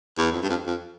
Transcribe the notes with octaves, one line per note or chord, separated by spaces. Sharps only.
E2
F2
G2
F2
F2